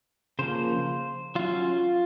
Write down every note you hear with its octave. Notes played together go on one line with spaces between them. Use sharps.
C#3 F3 A#3 C5
F#3 C#4 F4